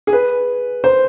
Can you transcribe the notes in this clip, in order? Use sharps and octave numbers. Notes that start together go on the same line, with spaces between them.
G#4
B4
C5